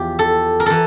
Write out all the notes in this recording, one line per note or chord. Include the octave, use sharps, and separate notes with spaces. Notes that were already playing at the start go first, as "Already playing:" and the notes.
Already playing: E2 F3 G4
A4
A#4
E3 A4